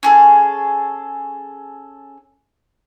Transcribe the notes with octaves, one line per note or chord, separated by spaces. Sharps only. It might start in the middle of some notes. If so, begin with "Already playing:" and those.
C#4 G#4 A4